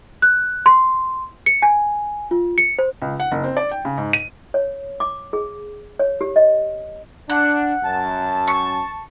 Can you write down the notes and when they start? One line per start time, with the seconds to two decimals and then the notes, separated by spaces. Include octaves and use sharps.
0.22 F#6
0.66 C6
1.46 C#7
1.62 G#5
2.31 F4
2.58 C#7
2.79 C5
3.02 C#2
3.20 F#5
3.32 F#1
3.44 C4
3.57 D5
3.71 G5
3.85 C#3
3.98 G#2
4.13 D#7
4.54 C#5
5.00 D6
5.33 G#4
5.99 C#5
6.21 G4
6.36 D#5
7.30 D4 F#5
7.84 F#2 A5
8.47 C#6